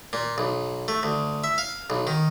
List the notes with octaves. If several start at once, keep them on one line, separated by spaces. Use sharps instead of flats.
A#2
B1
A3
D2
E5
F5
B1
D#3